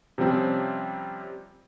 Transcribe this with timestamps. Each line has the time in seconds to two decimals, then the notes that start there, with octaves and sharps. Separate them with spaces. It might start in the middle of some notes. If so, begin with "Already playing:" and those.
0.18 C3 F3 G3 C4 C#4